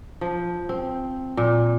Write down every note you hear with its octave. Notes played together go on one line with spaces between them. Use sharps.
F3
C4
A#2